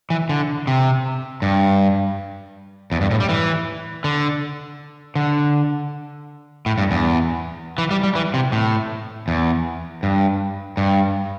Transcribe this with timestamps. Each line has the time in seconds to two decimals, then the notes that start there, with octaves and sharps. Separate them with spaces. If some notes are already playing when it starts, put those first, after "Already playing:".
0.10 E3
0.29 D3
0.67 C3
1.42 G2
2.92 E2
3.01 G2
3.11 A2
3.20 G3
3.29 E3
4.04 D3
5.15 D3
6.66 A2
6.78 G2
6.91 E2
7.78 E3
7.91 G3
8.03 G3
8.15 E3
8.34 C3
8.52 A2
9.28 E2
10.03 G2
10.77 G2